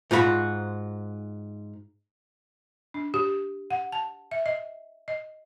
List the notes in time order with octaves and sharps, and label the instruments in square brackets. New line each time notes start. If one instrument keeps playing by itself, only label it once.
[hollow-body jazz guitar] G#2 F4 F#4 A#5 B5
[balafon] D4
G4
F#5
A5
E5
D#5
D#5